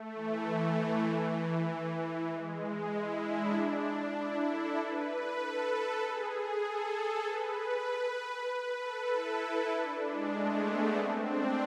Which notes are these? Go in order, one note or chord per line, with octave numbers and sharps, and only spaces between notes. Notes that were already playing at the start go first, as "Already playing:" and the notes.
Already playing: A3
E3
E3
G#3
E4
D4
E4
A4
B4
A4
G#4
A4
B4
B4
A4
E4
D4
G#3
A3
B3
C4
D4